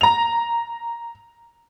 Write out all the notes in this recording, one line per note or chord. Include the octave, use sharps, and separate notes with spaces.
A#5 F7